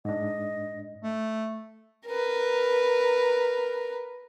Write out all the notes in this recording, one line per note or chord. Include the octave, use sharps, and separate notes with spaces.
G#2 D4 D#5
A3
A#4 B4